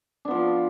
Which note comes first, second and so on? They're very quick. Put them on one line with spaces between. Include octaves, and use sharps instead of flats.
D4 B3 F3